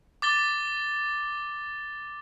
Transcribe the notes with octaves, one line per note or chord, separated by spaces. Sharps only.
D6 A6 G7